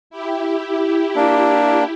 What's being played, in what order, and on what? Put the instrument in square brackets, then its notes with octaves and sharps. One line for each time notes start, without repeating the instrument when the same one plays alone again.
[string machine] E4 G4
[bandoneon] A#3 D4